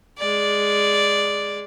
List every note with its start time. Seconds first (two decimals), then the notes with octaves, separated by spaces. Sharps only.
0.18 G#3 D5